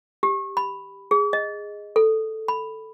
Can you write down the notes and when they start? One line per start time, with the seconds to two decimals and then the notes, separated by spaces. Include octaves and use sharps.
0.23 G4
0.57 B5
1.11 G#4
1.33 D#5
1.96 A4
2.48 B5